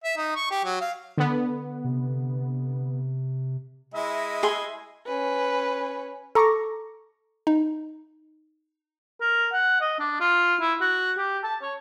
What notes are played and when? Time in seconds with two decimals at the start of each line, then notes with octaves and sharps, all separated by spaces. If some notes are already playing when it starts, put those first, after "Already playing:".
0.04 E5
0.17 D#4
0.36 C#6
0.51 G4
0.65 F#3
0.81 F5
1.17 D3 B3
1.84 C3
3.94 G#3 E4 D#5 E5
4.43 G#4 G#5 C6
5.07 C#4 B4
6.35 A4 A#5 C#6 D6 A#6 C#7
7.47 D#4
9.21 A#4
9.53 F#5
9.81 D#5
9.99 D4
10.20 F4
10.60 E4
10.81 F#4
11.17 G4
11.43 A5
11.62 C#5